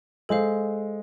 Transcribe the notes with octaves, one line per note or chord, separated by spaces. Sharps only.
G#3 A4 C5 F5